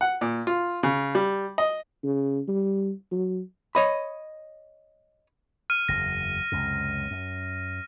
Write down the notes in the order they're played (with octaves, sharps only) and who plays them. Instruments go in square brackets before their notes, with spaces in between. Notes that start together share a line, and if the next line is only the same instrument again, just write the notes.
[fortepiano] F#5
A#2
F4
C#3
G3
D#5
[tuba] C#3
G3
F#3
[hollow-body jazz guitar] C#5 D#5 B5
[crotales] F6 D#7
[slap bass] F#1 E2 [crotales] A#6
[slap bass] C#2 F#2 C3
F#2